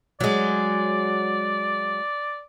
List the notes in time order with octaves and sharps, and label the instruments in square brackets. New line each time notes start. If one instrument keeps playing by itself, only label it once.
[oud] F#3 G#3 [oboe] D5